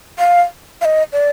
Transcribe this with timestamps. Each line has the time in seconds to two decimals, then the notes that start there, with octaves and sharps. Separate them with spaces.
0.19 F5
0.81 F5
0.85 D#5
1.13 D5